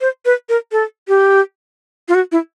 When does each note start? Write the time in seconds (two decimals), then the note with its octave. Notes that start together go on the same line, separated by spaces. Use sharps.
0.01 C5
0.25 B4
0.49 A#4
0.72 A4
1.08 G4
2.08 F4
2.14 F#4
2.32 E4